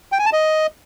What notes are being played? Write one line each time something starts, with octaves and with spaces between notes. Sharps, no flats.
G5
G#5
A5
D#5